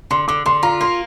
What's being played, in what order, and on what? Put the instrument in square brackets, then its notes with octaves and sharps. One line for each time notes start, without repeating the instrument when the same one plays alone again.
[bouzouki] D3 [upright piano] C6
[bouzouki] D3 [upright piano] D6
[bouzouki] D3 [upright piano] C6
[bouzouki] F4 [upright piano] A#5
[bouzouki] A#3 [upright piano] C6